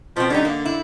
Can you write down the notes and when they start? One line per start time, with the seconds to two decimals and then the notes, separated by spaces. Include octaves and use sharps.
0.16 B2 F3 C4
0.30 D3 G3 C#4 D#4
0.45 A#3
0.65 E4